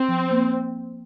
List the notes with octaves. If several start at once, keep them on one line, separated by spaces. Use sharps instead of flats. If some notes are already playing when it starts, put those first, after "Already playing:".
Already playing: C4
F3
A#3